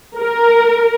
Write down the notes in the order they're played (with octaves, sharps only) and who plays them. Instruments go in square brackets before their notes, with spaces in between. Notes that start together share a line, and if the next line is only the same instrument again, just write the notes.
[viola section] A#4